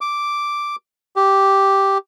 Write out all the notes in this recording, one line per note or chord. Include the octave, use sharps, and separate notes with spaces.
D6
G4